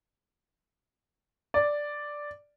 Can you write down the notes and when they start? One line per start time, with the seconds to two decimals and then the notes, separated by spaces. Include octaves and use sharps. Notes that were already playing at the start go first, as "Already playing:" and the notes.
1.54 D5